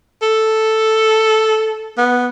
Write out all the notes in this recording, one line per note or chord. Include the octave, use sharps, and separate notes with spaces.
A4
B3